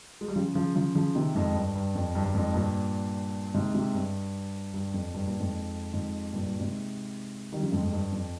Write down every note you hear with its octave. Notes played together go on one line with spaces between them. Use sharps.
G#3
G3
C#3 F3
C#3 F3
C#3 F3
C#3 F3
C3 D#3
F2 G#2
G2
G2
F2
G2
G2
F2 G#2
G2 A#2
G#2 C3
G#2 C3
G2
G2
F2
G2
G2 A#2
F2 G#2
F2 G#2
G2 A#2
G2 A#2
G#2 C3
D#3 G3
C#3 F3
F2 G#2
F2 G#2
G2
F2